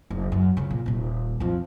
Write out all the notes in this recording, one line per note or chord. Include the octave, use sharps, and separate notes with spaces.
F#1
F#2
C#3 F3
A#2
D#1 A#2
F2 F3